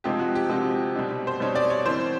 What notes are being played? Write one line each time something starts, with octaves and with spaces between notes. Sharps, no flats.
C3 F3 G#3 C4 D#4 G4
F#4
G4
C3 F3 G#3 C4 D#4
B2 G3 C4 D#4
C5
B2 G3 C4 D#4 C#5
D5
C#5
E3 G3 C4 C5